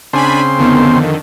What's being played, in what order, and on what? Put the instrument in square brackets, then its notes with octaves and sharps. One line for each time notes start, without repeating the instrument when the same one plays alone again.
[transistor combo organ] C#3 C4 C6 [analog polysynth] D4 G#5 B5
[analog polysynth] F2 D3 D#3 [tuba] B3